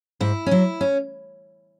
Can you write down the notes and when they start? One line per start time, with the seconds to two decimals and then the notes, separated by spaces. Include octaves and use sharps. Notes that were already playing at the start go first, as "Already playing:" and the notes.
0.20 G#2 E4
0.46 C#4
0.51 F#3 E4
0.81 C#4